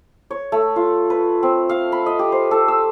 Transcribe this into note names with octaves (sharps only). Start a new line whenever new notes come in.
C#5
A3
F4
B4
C4
F5
B5
D#5
G4
C5
A4
E6